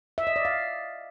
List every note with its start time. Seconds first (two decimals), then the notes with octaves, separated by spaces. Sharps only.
0.18 E5
0.27 D#5
0.36 D5
0.45 F5